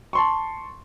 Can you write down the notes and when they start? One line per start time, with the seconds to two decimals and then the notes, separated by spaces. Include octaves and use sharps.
0.13 A5 C6 C#6